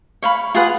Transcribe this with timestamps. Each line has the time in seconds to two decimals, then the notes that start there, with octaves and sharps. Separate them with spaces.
0.22 C#5 F5 B5
0.55 F4 G#4 B4 F#5